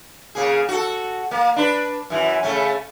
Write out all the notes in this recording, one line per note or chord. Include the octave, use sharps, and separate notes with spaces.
C#3 A#3 G#4
F#4 A4
A#3
D4 B4
F#2 E3
C#3 A3 C#4